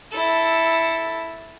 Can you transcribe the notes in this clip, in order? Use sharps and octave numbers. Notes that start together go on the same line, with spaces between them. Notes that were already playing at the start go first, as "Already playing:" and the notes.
E4 A4